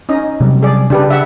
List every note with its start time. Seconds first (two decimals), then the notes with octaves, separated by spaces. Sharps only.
0.09 C#4 D#4 D#5
0.40 C3 F#3 G3
0.63 G#4 D5
0.90 C#3 D4 G4 B4
1.10 E5 F#5